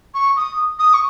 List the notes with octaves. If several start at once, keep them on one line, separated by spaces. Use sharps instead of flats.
C#6
D#6
D#6
C#6